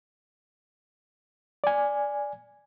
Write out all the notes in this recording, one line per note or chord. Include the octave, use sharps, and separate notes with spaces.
D5 G#5